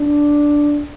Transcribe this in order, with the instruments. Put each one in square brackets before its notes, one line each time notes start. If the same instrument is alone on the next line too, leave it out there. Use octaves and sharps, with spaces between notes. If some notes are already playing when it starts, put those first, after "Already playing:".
Already playing: [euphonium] D4